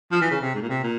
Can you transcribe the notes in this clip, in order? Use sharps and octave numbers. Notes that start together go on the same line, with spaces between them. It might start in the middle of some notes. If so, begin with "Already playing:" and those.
F3
E3
C#3
C3
G#2
A#2
C3
A#2